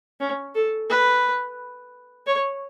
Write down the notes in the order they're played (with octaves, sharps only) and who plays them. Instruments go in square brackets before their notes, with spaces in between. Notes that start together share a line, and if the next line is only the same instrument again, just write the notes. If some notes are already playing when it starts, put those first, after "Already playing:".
[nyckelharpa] C#4
A4
B4
C#5